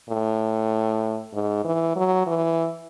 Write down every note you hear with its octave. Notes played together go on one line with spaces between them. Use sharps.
A2
G#2
E3
F#3
E3